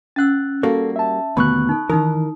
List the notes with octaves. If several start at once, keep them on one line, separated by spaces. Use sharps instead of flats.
C#4 F#5 E6 F#6 A6
G3 A#3 F#4 A4
E5 A5
D#2 B2 D3 A3 B3 B5 C#6 F#6
D#4 A4
D#3 E3 D#4 A#4 D#6